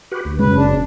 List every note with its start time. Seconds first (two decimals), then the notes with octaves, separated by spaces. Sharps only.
0.12 F#4 G4 B4
0.25 D2
0.39 F#2 C#3 G#3 C#4 B4
0.55 F#1 D4